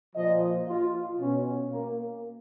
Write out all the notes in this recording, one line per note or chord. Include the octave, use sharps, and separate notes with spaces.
A#2 F3 D#5
F4
B2 C#4
A#3